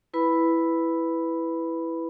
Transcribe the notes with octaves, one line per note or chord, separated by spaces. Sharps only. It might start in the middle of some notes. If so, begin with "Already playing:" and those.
E4 B4 B5